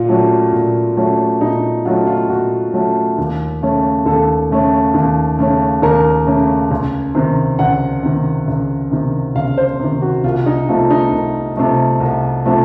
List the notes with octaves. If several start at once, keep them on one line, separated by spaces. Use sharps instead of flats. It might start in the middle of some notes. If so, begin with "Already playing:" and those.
Already playing: A#2 F4
F#3 A3 C#4
A#2
F#3 A3 C#4
A#2 D#4
F#3 A3 C#4 F4
F4
A#2 F#4
F#3 A3 C#4
D#2
C#3 A3 C#4
D#2 A4
C#3 A3 C#4
D#2
C#3 A3 C#4
D#2 A#4
C#3 A3 C#4
C#2
C3 D#3
C#2 F#5
C3 D#3
C#2
C3 D#3
C#2 F5
C5
C3 D#3
F#4
C2 F4
D#4
C3 F3 A3 F4
D#4
C2
C3 F3 A3
C2
C3 F3 A3